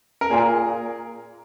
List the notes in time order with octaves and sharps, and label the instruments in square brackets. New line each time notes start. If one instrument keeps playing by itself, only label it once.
[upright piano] A#4
[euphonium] A#2 [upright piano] G#4